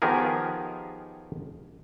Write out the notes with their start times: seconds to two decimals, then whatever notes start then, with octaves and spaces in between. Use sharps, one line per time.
0.02 D#3 F3 B3 G4 G#4 A#4